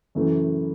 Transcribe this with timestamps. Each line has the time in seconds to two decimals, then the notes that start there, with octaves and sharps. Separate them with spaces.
0.15 F#2 C#3 E3 A3